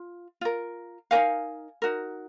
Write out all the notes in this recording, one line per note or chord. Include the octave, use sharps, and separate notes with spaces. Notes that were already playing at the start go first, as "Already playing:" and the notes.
Already playing: F4
F4 A#4
D#4 F#4 A#4 F5 G#5
D#4 F#4 A#4